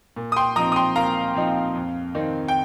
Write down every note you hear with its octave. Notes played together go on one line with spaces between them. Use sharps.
A#2
D#6
G5 C6
F3 C4 D#4 A#5 D#6
D#6
G5 C6
A#2 F5 A#5
F3 C4 D#4
F2
D#3 C4 D#4
G5